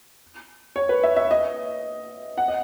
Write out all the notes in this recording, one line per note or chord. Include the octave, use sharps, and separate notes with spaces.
C#5
B4
E5
E5
D#5
F#5
D#5